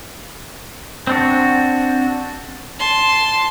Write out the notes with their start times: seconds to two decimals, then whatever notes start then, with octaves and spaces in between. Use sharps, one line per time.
1.07 C4 D4 F#4
2.79 A5 C6